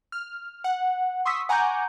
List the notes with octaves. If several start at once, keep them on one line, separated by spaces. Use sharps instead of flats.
F6
F#5
C6 C#6 D#6 E6 B6
F#5 G#5 A#5 C#6 D6 G6